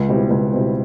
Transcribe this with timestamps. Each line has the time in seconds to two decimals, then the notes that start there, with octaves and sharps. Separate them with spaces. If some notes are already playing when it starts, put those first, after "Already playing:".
Already playing: C#2
0.08 B2 G3 C4 E4
0.31 C#2
0.53 B2 G3 C4 E4